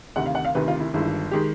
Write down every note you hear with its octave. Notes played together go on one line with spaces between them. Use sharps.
D2 C3 D#3 F#5
F5
F#5
F5
D2 C3 D#3 B4
F4
E4
G1 G2 D#3 G#3 E4
D#3 G#3 G4